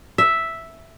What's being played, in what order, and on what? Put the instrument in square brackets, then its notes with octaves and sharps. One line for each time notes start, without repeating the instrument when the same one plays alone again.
[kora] E5